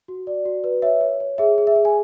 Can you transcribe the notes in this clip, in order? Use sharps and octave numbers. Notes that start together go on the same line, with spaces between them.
F#4
D5
F#4
B4
C#5 E5
C#5
C#5
G#4 E5
G#4
E5
G#4
G#5